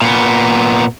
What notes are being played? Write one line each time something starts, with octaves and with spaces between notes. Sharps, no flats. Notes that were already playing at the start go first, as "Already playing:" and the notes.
A#2 B3